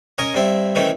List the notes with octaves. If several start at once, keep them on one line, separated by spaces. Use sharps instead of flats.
C#4 A#4 D#5 G#5
G2 C4 E4
D#3 E3 A3 C4 C#4